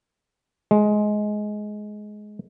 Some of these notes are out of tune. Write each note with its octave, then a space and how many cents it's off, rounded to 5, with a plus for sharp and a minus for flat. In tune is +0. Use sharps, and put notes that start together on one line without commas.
G#3 +15